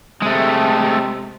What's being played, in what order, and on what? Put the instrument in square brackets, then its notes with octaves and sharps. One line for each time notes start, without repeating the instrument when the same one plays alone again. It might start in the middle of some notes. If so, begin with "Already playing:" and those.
[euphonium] C3 [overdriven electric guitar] G#3 A3